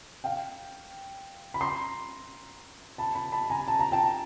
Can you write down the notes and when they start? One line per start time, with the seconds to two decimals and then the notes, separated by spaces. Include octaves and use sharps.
0.24 F5 G5
1.54 B5
1.61 A#5 C6
2.98 A5 B5
3.15 A5 B5
3.32 A5 B5
3.50 G#5 A#5
3.68 A5
3.79 A#5
3.92 G5 A5